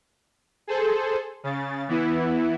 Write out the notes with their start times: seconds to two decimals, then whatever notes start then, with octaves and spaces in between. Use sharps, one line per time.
0.67 G#4 A4 C5
1.43 C#3 A6
1.88 E3 B3 E4